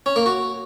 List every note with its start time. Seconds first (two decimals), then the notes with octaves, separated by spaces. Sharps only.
0.06 C#4
0.16 A#3
0.26 F#4